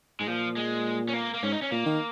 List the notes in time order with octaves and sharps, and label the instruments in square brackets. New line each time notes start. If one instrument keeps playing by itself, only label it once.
[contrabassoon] G#2 [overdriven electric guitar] G#3
[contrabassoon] A#2 [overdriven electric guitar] F3
[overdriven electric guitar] G#3
C#4
A#3
A#3
[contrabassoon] G#2 [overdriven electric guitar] C#4
[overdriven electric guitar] D#4
C#4
[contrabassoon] A#2 [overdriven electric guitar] A#3
[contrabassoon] D#3